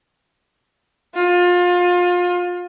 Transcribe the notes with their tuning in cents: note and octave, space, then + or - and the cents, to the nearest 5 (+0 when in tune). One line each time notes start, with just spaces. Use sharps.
F4 +30